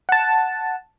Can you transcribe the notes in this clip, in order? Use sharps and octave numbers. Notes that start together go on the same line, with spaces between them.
F#5 A5